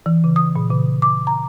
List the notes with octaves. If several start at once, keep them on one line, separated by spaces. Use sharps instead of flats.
E3
C#3
D#6
A#2
C#3
D6
A#5